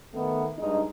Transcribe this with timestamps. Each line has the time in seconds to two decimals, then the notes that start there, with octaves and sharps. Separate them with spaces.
0.14 D#3 A3 B3
0.58 G2 G#3 D#4